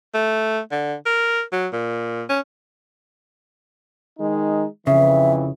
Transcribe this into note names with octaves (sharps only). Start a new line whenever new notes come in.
A3
D3
A#4
F#3
A#2
C#4
D#3 G#3 D#4
F2 C#3 E3 E5